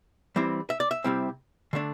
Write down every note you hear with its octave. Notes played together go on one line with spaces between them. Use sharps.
E3 G3 C4 E4
E5
D5
E5
C3 G3 C4 E4
D3 A3 D4